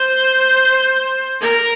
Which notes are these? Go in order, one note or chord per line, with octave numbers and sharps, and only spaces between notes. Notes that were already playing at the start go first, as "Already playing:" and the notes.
Already playing: C5
A#4